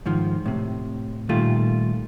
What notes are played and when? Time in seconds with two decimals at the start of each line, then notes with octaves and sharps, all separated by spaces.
0.06 G#2 D#3 F3
0.46 A2 C3
1.29 A#2 D#3 G3 A3 F4